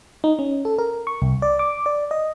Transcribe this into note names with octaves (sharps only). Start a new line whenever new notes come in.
D#4
C#4
A4
A#4
C#6
C2
D5
D6
D5
D#5